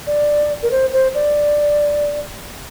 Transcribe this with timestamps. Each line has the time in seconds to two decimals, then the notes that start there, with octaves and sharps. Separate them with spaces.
0.07 D5
0.63 A#4
0.71 C5
0.93 C5
1.14 D5